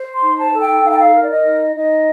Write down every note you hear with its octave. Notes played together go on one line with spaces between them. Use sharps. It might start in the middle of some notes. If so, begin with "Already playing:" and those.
Already playing: C5
C6
D#4
A5
A4
G5
D#4 F5
G5
F5
A#4
D5
D#5
D#4
D#4 D#5